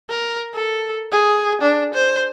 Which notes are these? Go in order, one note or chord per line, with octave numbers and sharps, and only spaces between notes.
A#4
A4
G#4
D4
C5